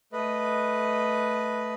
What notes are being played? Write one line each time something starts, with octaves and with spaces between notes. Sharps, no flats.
A3 B4 D#5